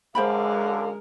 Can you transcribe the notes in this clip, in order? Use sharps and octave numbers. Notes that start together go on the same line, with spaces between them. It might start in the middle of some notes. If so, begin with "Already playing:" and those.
F#2 D3 G#3 A#4 C5 F5 G5 B5